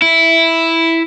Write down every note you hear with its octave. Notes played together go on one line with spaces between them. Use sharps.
E4